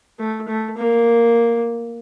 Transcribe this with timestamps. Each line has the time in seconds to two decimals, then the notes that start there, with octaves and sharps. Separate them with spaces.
0.19 A3
0.48 A3
0.78 A#3